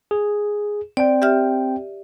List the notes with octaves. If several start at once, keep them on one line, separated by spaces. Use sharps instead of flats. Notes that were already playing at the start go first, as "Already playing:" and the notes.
G#4
C4 D5 G5
G4 E5 F6